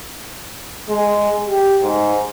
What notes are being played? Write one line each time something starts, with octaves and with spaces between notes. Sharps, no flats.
G#3
G4
G#2